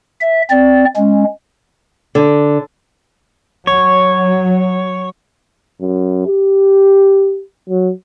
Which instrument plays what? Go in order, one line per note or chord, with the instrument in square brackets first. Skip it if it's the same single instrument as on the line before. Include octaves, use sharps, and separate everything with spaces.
[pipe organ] E5
C4 D5
G#3 C#4
[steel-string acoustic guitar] D3
[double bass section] F#3 [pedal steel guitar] C#5
[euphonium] F#2
G4
F#3